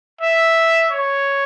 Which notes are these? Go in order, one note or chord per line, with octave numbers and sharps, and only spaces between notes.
E5
C#5